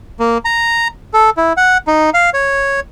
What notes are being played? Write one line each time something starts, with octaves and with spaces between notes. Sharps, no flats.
A#3
A#5
A4
E4
F#5
D#4
F5
C#5